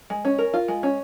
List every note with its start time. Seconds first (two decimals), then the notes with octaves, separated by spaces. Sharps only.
0.10 G#3
0.25 C#4
0.38 A#4
0.54 F4
0.68 G#3
0.83 C#4